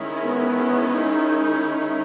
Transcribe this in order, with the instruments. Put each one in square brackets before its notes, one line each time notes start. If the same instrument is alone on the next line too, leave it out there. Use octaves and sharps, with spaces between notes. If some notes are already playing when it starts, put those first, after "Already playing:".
Already playing: [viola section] D#3 G#3 C#4 E4
[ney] B3
D#4
D#4